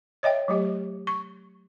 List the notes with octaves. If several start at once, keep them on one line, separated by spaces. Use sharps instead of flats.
C#5 D#5 E5 G5
F#3 A3 G4
C#6